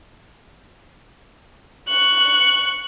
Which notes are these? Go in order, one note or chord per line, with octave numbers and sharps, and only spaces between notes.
C#6 F#6